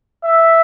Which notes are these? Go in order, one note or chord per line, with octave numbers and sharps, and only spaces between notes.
E5